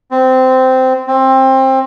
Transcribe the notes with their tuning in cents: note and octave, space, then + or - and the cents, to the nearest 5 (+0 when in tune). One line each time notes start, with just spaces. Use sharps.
C4 -15
C4 +20